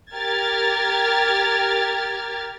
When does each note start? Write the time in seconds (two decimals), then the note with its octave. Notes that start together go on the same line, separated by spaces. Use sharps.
0.13 G4 A#4 F6 G#6 A6